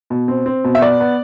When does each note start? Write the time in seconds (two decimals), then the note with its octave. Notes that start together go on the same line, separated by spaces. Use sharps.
0.10 B2
0.28 C4
0.46 C4
0.64 B2
0.75 E5
0.81 B3 D5
1.00 B3